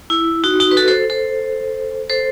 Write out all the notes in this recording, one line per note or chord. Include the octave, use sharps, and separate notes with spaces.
E4
D#4 F#4
D#4 F#4
B4
F#4 A4
A4 C5
A4 C5
A4 C5